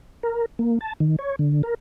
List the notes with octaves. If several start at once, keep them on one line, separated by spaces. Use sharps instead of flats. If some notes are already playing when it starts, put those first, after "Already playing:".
A#4
A#3
A5
D#3
C#5
D3
A#4